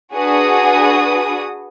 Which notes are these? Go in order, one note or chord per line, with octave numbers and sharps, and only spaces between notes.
D4 F#4 G#4 B4 D#6